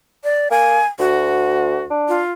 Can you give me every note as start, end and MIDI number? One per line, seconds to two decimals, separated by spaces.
0.24 0.48 74
0.51 0.80 58
0.51 0.86 80
0.99 1.83 38
0.99 1.84 66
1.90 2.19 62
2.08 2.31 65